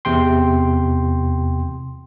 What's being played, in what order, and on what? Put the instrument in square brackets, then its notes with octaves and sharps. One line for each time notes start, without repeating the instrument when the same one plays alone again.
[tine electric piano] E2 C3 G5 C6